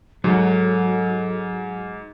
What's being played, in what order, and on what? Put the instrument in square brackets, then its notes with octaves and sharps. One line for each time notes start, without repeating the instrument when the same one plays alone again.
[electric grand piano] G#2 [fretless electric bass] F#3 [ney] A4